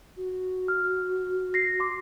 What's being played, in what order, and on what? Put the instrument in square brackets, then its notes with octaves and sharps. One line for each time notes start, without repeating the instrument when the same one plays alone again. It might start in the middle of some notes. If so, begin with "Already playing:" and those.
[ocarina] F#4
[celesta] F6
A#6 C7
C6 D6